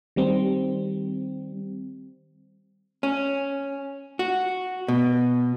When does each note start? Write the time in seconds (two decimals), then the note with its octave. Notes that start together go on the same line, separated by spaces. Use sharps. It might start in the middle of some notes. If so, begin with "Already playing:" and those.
0.16 D#3 G3 C4
3.03 C#4
4.19 F#4
4.88 B2